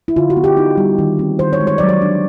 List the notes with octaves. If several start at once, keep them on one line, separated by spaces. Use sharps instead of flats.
E4
D3 F4
F#4
B3
G4
D#4
G3
D#3
C4
D#3 C5
C#5
G#3
C#5
F#3 D5
C#5
D4